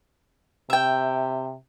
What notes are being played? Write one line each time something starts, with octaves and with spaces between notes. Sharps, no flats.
C3 E5 G5